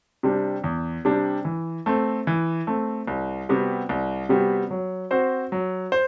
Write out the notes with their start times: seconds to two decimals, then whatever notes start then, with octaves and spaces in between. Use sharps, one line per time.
0.23 C3 G3 D4
0.64 E2
1.05 C3 G3 D4
1.45 E3
1.86 A3 C4
2.27 E3
2.67 A3 C4
3.08 C2
3.49 C3 G3 B3 F#4
3.89 C2
4.29 C3 G3 B3 F#4
4.71 F#3
5.11 C4 F#4 C5
5.52 F#3
5.92 C5